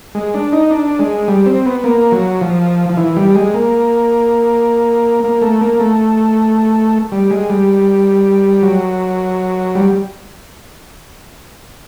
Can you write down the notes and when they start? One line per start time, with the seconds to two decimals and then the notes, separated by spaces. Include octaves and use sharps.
0.15 G#3
0.34 D4
0.52 D#4
0.71 D4
0.99 G#3
1.28 G3
1.46 C4
1.66 B3
1.84 A#3
2.12 F#3
2.41 F3
2.90 F3
2.97 E3
3.17 G3
3.35 G#3
3.54 A#3
5.24 A#3
5.42 A3
5.61 A#3
5.80 A3
7.12 G3
7.30 G#3
7.50 G3
8.63 F#3
9.75 G3